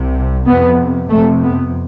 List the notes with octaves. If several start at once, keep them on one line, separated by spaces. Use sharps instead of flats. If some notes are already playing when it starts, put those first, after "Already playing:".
Already playing: C2 C3
F2 C3 B3
F2 C3 A3
B3